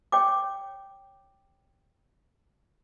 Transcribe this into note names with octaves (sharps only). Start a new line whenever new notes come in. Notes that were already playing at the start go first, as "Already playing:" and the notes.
C#5 G5 D6